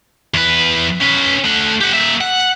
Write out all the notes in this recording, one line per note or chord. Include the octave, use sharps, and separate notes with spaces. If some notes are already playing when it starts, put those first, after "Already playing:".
E2 B4
C#4 B4
A3 F#5
G4 F#5
A#3 E5
F#5